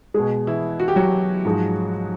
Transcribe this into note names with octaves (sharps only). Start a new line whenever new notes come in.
B2 G#3 G#4
E3 E4
F#4
G4
F#3 F#4
G#2 F3 G#3